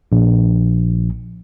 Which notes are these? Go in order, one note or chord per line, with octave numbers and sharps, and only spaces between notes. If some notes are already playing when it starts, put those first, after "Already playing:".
A#1